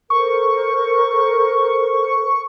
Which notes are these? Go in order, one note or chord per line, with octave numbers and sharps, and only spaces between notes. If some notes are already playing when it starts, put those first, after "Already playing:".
A4 A#4 C5 C#6